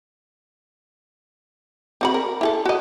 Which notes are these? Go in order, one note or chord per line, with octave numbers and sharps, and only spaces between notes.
C4 F#4 B5
A#4
E4 G#4 A4
F#4 D#5